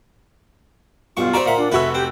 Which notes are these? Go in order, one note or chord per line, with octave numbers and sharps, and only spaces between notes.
B1 G2 F4 C#6
F#4 C5 D5 E5 A#5
A#2 E5 F#5
D4 F4
F1 F#4 B4 C#5 E5 E6
C4 G4